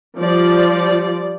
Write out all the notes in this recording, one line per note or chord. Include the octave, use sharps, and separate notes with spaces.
F3 G3 D5